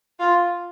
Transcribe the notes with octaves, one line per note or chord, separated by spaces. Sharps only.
F4